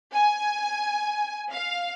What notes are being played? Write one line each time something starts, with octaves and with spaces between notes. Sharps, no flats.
G#5
F5